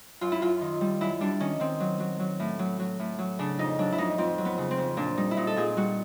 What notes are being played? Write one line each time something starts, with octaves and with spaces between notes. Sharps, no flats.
F#2 F4
E4
F#2 F4
D#3
G3
F#2 E4
G3 D4
D#3 C#4
D#3 C4
F#3
F#3
F#3
A2
F#3
F#3
A2
F#3
C#3 D4
F2 D#4
F#3 D4
E4
F2 D#4
F2 C4
F#3
B3
C#3
C4
F2
A#2 D4
G3 D#4
E4
A#2 D#4
A4
A#2 G#4
G3 F#4